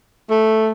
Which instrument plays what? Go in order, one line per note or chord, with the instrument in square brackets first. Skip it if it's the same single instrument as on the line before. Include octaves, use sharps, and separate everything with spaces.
[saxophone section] A3